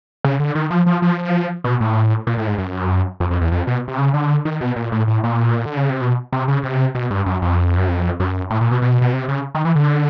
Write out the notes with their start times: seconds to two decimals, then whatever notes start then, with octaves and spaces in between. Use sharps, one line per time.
0.24 C#3
0.40 D3
0.55 D#3
0.71 F3
0.86 F3
1.02 F3
1.64 B2
1.80 A2
2.27 A#2
2.37 A2
2.47 G#2
2.58 F#2
3.20 F2
3.31 F2
3.41 E2
3.52 F2
3.67 B2
3.88 C3
3.98 C#3
4.14 D3
4.45 D#3
4.61 B2
4.76 A#2
4.92 A2
5.08 A2
5.24 A#2
5.65 D3
5.77 C#3
5.90 C3
6.01 B2
6.32 C3
6.48 C#3
6.63 C3
6.95 B2
7.11 G2
7.26 F#2
7.42 F2
7.77 F#2
7.88 F2
8.20 F#2
8.50 A2
8.61 A#2
8.71 B2
8.82 B2
9.01 B2
9.13 C3
9.28 C#3
9.55 D#3
9.65 E3
9.75 D3